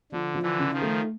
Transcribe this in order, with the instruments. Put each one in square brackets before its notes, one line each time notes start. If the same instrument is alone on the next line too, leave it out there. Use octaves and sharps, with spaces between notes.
[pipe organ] D3 [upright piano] F3
[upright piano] F3
[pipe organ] D3 E3
[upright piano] C#3
[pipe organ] D#3 F3
[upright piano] A3